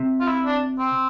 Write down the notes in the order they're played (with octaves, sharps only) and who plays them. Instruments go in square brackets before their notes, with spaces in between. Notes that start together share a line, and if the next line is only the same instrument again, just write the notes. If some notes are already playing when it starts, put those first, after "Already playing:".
Already playing: [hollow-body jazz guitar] C3
[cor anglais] F4
E4
D4
C4